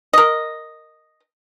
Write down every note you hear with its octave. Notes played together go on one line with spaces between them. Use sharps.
A#4 D#5